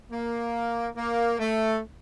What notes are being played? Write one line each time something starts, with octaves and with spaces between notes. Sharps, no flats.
A#3
A#3
A3